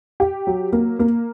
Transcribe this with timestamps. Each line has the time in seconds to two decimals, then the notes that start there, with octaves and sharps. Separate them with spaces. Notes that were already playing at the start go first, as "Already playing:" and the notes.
0.20 G4
0.47 F#3
0.73 A#3
0.99 A#3